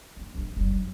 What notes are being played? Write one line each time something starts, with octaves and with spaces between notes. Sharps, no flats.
A#3
A#1 E3
F#1 G3
F#3